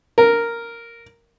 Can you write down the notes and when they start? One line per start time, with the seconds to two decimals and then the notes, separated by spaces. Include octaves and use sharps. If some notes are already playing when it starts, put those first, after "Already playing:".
0.18 A#4